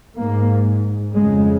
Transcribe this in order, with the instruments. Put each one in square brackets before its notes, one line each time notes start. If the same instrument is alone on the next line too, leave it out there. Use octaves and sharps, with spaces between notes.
[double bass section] G#2 A#3
F2 C#3 G#3